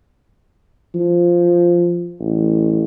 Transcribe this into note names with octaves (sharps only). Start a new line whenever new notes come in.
F3
A1